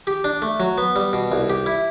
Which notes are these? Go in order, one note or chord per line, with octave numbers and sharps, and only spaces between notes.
G4
D4
A3
F#3
B3
G3
B2
C2
G4
E4